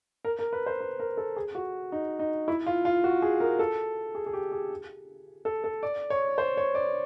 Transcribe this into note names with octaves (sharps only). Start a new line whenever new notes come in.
A#4
A#4
B4
C5
B4
A#4
A4
G#4
F#4
D#4
D#4
E4
F4
F4
F#4
G#4
A#4
A4
G#4
G#4
G4
G#4
A4
A4
D5
C#5
C5
C#5
D5